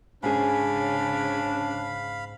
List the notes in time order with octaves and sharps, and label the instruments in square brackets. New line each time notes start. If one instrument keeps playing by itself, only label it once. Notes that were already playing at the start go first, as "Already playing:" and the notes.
[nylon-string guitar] G#2 G#4 [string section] C#3 C#4 [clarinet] D4 [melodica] F5 B5